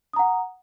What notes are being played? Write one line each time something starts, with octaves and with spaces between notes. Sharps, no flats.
F#5 A#5 D#6